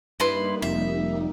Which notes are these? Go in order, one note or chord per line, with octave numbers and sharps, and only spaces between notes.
G2 G3 A#3 D#4 E4 B4 C6
F1 F2 E5